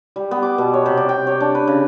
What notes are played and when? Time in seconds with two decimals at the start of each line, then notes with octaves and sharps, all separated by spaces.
0.16 G3
0.31 B3
0.43 D6
0.58 B2
0.74 C#5
0.86 C3
0.97 D5
1.09 G5
1.27 C#5
1.40 D4
1.55 B4
1.67 C#3